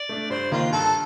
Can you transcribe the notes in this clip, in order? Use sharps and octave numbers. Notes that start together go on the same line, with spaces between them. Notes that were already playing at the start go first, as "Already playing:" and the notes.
Already playing: D5
A3 D4
G2 C5
D#3 A#3 D4 F4
G2 A4